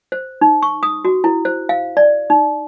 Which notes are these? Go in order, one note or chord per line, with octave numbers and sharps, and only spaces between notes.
C5
D#4
C#6
D#6
F#4
E4
C5
F5
D5
D#4